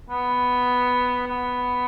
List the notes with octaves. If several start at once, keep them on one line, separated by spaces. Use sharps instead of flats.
B3
B3